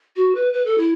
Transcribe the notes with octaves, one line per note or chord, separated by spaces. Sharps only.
F#4
B4
B4
A4
E4